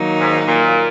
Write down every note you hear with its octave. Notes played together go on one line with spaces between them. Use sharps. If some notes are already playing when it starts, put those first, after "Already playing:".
Already playing: D#3 F#3 A#3 D#4
G#2
A#2